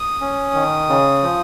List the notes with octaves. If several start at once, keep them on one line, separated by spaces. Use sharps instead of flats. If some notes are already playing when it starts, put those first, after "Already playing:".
Already playing: D#6
C#4
D#3
C#3
F3